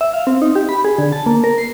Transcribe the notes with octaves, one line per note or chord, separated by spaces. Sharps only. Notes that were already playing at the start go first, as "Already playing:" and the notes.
E5
F5
C4
D#4
G4
B5
G#4
D3
A5
A#3
A#4
C7